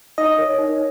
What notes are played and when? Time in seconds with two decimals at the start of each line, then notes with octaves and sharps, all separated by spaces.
0.18 D#4 D#5
0.38 A#4 C#5
0.58 D#4